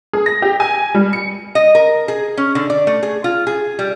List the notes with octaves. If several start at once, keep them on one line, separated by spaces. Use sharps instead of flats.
G#4
A#6
G4
G#5
G3
C#7
D#5
A#4
G#4
C#4
D3
D5
A3
G#4
F4
G#4
G3